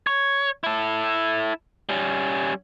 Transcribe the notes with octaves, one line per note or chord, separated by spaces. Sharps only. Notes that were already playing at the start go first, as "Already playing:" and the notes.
C#5
E4 A4
G3 C#4